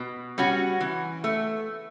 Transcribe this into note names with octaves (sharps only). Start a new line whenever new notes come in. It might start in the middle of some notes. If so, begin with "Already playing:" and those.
Already playing: B2
G3 C#4 F#4
E3
A3